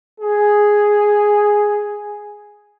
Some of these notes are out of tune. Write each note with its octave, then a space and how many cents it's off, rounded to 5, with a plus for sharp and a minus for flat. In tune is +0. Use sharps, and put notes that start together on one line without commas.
G#4 +0